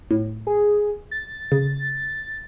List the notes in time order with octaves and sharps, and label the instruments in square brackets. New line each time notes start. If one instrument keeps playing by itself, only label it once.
[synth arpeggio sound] A2
[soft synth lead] G#4
A6
[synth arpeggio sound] C#3